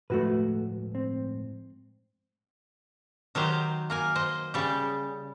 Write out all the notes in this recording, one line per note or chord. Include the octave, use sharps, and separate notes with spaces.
A2 F3 G#3 A3 F#4 B4
C4
D#3 F#3 G4 C5
A#3 A#4 G#5
C5 D#5
C#3 G3 G4